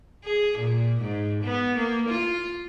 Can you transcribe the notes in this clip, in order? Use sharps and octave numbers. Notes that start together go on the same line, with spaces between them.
G#4
A#2
G#2
B3
A#3
F4